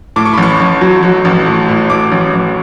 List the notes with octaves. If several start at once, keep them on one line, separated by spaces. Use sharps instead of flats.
A2 D6
C#6
B5
A1 C#6
A1
F#3
F#3
A1
A2
A2
A2 D6
A1
A1